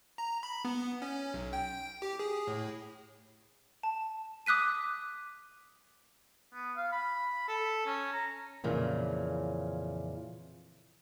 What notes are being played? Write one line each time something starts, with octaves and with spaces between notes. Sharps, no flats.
A#5
B5
B3
C#4
B1
G5
G4
G#4
A2
A5
D6 D#6 F#6 B6 D#7
B3
F5
B5
A4
C#4
A#5
F2 A#2 C#3 E3